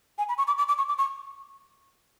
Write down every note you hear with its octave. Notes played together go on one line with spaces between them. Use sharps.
G#5
B5
C#6
D6
D6
D6
C#6
D6
C#6